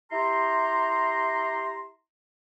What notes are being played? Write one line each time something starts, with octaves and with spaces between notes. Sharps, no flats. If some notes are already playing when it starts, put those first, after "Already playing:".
E4 G4 A#5 C6